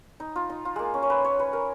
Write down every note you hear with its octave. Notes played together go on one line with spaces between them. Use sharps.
D#4
F4
D#4
F4
G#3 A#3
C#4
C#5
B4
C#5
B4
A#4